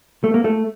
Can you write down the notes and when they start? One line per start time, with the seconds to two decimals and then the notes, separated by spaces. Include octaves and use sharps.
0.24 A3
0.34 A#3
0.44 A3